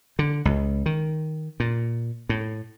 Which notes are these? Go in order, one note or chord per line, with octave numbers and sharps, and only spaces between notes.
D3
C#2
D#3
A#2
A2